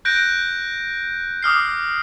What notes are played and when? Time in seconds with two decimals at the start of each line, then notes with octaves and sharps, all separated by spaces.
0.05 F#6 G6 A#6 D7
1.42 D6 D#6 F6 C7